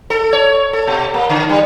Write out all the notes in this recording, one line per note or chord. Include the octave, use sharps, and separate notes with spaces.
A4
C#5
A4
B2
A#3
D3
G3